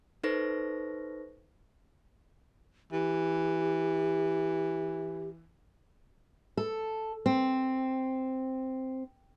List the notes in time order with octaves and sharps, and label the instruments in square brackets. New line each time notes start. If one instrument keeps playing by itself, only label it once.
[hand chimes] D#4 A4 B4 C5 C#6 A#6
[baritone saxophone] E3 [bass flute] G4
[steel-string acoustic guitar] A4
C4